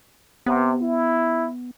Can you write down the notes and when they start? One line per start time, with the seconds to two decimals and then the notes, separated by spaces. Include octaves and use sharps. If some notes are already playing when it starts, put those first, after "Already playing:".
0.46 C3 B3
0.82 E4